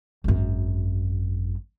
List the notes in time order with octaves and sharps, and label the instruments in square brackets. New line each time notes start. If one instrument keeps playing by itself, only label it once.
[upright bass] G#1 F#2